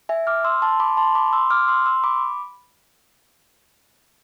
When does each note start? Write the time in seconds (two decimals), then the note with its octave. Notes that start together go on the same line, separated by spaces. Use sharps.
0.09 E5 G#5
0.27 D6 F6
0.44 C6 E6
0.62 A5 C6
0.80 B5 D6
0.97 A5 C6
1.15 B5 D6
1.33 C6 E6
1.50 D6 F6
1.68 C6 E6
1.86 C6 E6
2.04 B5 D6